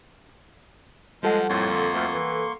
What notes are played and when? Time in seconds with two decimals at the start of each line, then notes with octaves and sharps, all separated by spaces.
1.23 F3 G3 G#3 A4 F#5
1.49 F2 A2 A#3 C6 C#6
1.71 D3
1.94 D2
2.12 E3